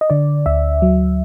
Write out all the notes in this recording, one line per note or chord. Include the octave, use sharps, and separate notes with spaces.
D#5
D3 D5
D2 E5
F#3